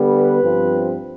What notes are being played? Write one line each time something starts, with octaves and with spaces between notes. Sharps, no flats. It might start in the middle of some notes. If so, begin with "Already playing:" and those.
Already playing: D3 G3 B3
B4
G2 F3 C4